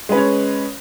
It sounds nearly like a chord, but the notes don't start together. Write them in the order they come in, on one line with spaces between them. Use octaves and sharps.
G#3 B4 C#4 C#5